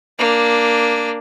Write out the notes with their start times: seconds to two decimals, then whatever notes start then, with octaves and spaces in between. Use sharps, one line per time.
0.18 A#3 D4